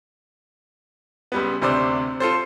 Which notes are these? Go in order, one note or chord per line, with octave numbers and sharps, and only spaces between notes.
C#2 G3 B3
D2 C3 C5 D5 E6
F4 A4 C5